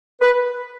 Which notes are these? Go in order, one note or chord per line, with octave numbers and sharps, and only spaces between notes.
B4